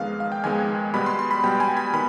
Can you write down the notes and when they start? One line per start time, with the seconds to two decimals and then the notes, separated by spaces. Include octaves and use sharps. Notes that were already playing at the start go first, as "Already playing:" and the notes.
Already playing: F2 D#3 G#3 B3 F5
0.20 F5
0.32 G5
0.44 F2 D#3 G#3 B3 G#5
0.94 B2 G3 B3 B5
1.06 C6
1.19 C6
1.31 B5
1.44 B2 G3 B3 G5
1.60 G#5
1.77 B5
1.94 D#3 B3 B5